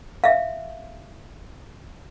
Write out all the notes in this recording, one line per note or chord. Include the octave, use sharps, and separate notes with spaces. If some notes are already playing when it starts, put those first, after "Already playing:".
E5 F5